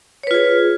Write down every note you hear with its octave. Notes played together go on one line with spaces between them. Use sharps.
F4 G#4 B4 C#5